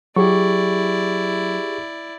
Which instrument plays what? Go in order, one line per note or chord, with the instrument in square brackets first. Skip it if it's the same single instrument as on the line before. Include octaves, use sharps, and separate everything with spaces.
[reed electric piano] F#3 [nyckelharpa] E4 D5 [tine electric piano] G4 G#4 C#6